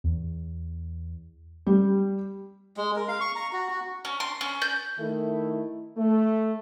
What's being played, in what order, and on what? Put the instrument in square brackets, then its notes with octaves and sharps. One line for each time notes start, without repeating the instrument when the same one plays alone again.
[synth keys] E2
[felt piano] G3
[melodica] G#3
A#4
F5
C#6
A#5
F#4
F#4
[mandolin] C#4
C6
C#4
G6
[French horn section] D#3 A3 E4
A3